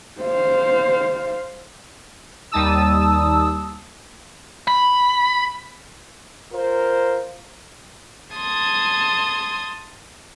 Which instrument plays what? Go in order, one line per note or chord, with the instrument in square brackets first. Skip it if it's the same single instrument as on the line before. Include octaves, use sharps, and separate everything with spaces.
[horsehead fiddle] C5 F5
[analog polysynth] D#2 G3 D#4 A5 D#6 E6
[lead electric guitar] B5
[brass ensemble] F4 A#4 C5
[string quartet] A5 C6 D#6 G#6